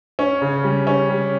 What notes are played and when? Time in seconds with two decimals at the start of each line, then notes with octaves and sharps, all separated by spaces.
0.19 C#4
0.42 C#3
0.64 G3
0.87 C#4
1.10 G3